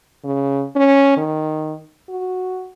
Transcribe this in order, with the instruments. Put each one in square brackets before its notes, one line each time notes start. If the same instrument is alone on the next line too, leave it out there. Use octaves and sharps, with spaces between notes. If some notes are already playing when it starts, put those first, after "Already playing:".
[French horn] C#3
C#4
D#3
F#4